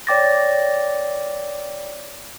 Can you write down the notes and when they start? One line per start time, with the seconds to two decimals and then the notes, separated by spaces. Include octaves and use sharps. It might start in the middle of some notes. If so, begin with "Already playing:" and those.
0.07 C#5 D5 G5 D6 A6 A#6